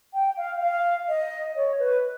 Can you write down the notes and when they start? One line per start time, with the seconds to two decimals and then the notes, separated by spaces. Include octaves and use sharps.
0.14 G5
0.37 F5
0.61 F5
1.08 D#5
1.56 C#5
1.79 B4